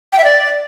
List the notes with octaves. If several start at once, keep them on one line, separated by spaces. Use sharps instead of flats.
G5
E5
D5